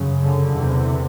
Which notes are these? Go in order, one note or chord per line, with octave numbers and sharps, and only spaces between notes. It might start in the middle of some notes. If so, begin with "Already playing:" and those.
Already playing: F#2 C#3
D3
E2 C3